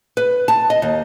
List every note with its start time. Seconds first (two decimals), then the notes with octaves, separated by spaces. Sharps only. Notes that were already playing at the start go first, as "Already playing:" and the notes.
0.17 B4
0.48 A5
0.70 D#5
0.82 D#2